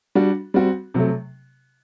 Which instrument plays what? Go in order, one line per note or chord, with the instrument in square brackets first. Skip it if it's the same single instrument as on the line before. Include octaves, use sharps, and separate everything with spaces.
[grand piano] G3 D4 F#4
G3 C4 F#4
C3 F#3 A3